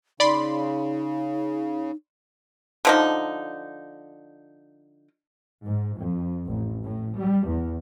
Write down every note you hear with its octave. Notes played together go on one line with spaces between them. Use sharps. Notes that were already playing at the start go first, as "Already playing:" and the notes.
C#3 D#4 D5 B5 C6
D3 F3 D#4
G#2
F2
A1
A2
G3
E2